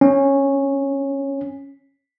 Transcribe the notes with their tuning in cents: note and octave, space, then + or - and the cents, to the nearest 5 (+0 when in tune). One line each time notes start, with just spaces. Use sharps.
C#4 -10